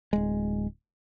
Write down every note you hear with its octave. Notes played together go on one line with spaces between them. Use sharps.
D1 G#3